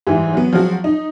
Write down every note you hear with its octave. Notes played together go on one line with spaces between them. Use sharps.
G#2 E3 G3
F#3 B3
F3 F#3 G#3 C4 F#4
D#4